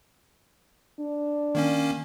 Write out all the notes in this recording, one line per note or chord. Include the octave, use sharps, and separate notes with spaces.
D4
D#3 A#3 C#4